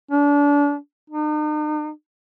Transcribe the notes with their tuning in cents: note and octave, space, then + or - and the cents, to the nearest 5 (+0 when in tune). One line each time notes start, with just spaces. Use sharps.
D4 -30
D#4 -45